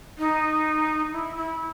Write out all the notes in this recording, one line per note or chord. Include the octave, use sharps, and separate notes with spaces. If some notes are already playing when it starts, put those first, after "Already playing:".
D#4
E4
E4